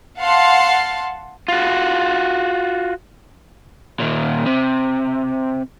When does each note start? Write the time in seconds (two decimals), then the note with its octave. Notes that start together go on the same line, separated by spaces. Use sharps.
0.19 F5 F#5 A5 C6
1.48 F4 F#4
3.99 A#2 D#3
4.46 C3